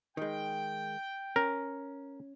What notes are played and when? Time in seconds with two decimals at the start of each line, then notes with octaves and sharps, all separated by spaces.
0.17 D#3 G#3 G5
1.36 C#4 A#4